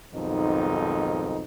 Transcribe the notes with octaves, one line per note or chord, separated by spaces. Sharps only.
B1 F2 G#2 D#3 D#4